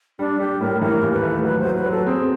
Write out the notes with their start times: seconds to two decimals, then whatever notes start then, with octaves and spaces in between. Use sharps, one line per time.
0.19 G3 D4
0.40 G3 G4
0.61 A2 A#4
0.81 E3 A#4
1.02 D#2
1.13 B4
1.23 A3
1.44 F#3 B4
1.59 C5
1.65 F#3
1.75 B4
1.86 F#3
1.91 A4
2.06 C4 G#4